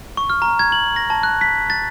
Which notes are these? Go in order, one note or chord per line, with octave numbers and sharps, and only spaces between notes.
C#6
F6
A#5
G#6
F#7
A#6
A5
F#6
B6
A6